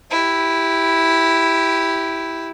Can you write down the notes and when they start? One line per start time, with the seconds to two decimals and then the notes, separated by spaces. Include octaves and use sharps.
0.11 E4 G4